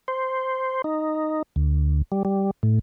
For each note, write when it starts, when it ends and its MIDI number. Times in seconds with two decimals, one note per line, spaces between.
0.08 0.82 72
0.84 1.42 63
1.56 2.02 38
2.12 2.23 55
2.25 2.51 55
2.63 2.79 45